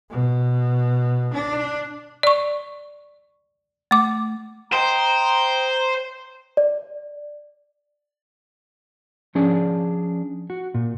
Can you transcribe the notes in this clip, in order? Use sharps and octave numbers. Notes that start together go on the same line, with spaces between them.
B2
D4
D5 C#6
A3 D6
C5 D#5 G5 A#5
D5
F3 C#4 D4 G#4 D5
F#4
A#2